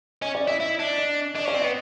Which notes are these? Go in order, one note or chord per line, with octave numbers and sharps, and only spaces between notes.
C#4 D#5
D5
E4 D#5
E4
D4
D#5
D4 D#5
C#4 D5
C4
B3 D#5